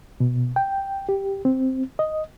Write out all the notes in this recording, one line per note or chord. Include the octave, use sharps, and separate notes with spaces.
B2
G5
G4
C4
D#5